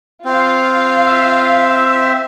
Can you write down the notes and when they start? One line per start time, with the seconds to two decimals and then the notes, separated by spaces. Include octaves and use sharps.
0.25 C4 F4 F5
1.07 E5